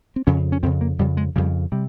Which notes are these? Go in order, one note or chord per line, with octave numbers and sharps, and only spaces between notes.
C4
F2 C#3 C#4
C#4
F2 C#3 C4
A#3
F2 C#3 G3
G#3
F2 C#3 G3
C3 G3